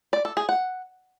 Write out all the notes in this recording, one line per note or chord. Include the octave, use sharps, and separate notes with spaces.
D5
A4
G#4
F#5